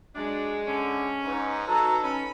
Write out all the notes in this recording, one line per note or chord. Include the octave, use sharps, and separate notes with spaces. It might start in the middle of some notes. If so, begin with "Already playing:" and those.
F#3 G#3 D4
D3 C#4
G#2 D#4 B4
F#3 A4 A#5
C#4 B5